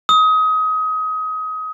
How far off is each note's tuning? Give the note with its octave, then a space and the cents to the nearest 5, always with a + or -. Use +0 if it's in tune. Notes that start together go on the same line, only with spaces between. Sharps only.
D#6 +25